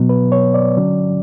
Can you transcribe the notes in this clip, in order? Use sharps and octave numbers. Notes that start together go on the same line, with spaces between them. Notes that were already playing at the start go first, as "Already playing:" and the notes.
Already playing: B2 F#3 B3
B4
C#5
D5
D3 F#3 C#4